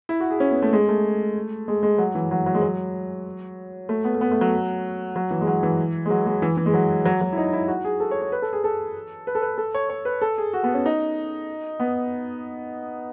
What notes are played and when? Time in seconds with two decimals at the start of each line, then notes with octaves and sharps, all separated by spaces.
0.09 E4
0.20 F#4
0.30 G#4
0.40 C#4
0.51 B3
0.62 A3
0.73 G#3
0.89 A3
1.68 G#3
1.83 G#3
1.98 F#3
2.15 E3
2.31 F#3
2.46 F#3
2.54 G#3
2.62 F#3
3.89 A3
4.05 B3
4.15 A3
4.21 B3
4.32 A3
4.41 F#3
5.16 F#3
5.31 E3
5.41 G#3
5.47 F#3
5.63 E3
6.06 G#3
6.10 F#3
6.26 G#3
6.42 E3
6.57 E3
6.66 G#3
6.74 F#3
7.06 F#3
7.21 F#3
7.33 E4
7.38 D#4
7.53 E4
7.68 F#4
7.85 G#4
8.00 A4
8.11 C#5
8.22 C#5
8.32 B4
8.42 A4
8.53 G#4
8.64 A4
9.27 B4
9.35 A4
9.42 B4
9.58 A4
9.75 C#5
9.90 C#5
10.05 B4
10.21 A4
10.38 G#4
10.53 F#4
10.63 B3
10.74 C#4
10.86 D#4
11.80 B3